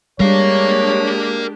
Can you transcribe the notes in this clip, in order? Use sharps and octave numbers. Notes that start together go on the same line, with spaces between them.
G3 G#3 D4 G4 A#4 C#5 F5